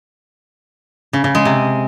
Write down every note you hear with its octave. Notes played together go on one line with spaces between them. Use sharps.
C#3
C#3
G#3
C3